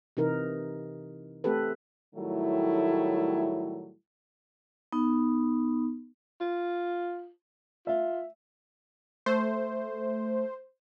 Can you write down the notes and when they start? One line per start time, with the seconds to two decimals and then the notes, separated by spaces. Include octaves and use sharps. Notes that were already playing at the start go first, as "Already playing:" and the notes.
0.17 C3 E3 D#4 A#4
1.44 A3 C4 G4 A4 B4
2.16 A2 D#3 F#3 G3 A3 E4
4.92 B3 D#4
6.41 F4
7.87 F4 E5
9.26 A3 C5